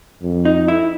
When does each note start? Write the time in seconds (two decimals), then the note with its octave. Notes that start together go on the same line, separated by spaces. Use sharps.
0.22 F2
0.45 D#4
0.68 E4